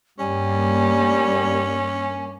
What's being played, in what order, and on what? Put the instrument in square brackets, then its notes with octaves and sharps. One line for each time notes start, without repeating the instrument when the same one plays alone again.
[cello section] G2 A#3 [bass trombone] G3 [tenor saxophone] C#4 [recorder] G#5